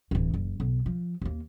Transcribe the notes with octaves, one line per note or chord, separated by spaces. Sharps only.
D1 E3
F#1
B1
F3
D#2 A#3